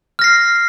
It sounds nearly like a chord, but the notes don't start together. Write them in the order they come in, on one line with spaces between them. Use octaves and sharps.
F6 A#6 C7